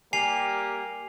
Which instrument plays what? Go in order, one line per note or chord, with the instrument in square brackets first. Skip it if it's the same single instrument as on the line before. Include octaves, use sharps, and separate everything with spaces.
[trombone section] G3 A#3 G4 [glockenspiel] G#5 C7 F7